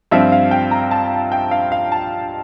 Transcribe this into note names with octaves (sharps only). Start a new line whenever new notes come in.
G2 F3 C4 F4 E5
F5
G5
A#5
A5
G5
F5
F5
A5